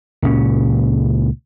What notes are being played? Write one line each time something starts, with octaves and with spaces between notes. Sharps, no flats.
C#2 A#2 C#4